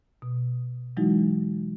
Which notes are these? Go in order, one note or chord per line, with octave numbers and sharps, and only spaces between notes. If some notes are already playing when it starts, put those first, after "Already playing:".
B2
E3 F#3 G#3 D#4 E4 F#4